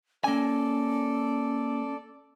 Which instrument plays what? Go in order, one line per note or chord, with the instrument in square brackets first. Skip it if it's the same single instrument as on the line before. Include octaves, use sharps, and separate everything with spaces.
[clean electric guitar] A#3 G#5 [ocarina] C#4 [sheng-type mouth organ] A4 D5